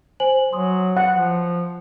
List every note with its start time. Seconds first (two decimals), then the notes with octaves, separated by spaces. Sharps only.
0.20 C5 G#5 F#7
0.53 F#3 C6 D#6
0.97 F#5
1.13 F3